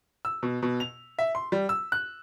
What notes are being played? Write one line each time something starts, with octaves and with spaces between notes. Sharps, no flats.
E6
B2
B2
F7
E5
C6
G3
E6
F#6